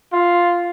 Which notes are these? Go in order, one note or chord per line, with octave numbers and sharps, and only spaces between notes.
F4